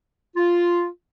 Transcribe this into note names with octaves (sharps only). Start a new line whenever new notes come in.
F4